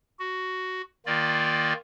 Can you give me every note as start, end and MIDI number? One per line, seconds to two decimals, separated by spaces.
0.19 0.81 66
1.06 1.73 51
1.06 1.73 58
1.06 1.73 65
1.06 1.73 74